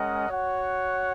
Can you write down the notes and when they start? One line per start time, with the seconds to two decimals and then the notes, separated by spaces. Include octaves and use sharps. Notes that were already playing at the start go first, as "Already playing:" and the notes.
Already playing: G#3 C#4 A#4 D#5 F#5
0.28 F#4 C#5 F#5